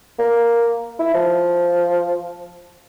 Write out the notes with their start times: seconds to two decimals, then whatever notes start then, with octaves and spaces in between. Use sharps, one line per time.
0.19 A#3
0.99 E4
1.14 F3